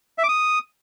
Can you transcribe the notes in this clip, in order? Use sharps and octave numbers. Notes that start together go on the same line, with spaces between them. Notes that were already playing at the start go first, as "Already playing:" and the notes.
E5
D6
D#6